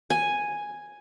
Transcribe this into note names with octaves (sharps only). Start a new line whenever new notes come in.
G#5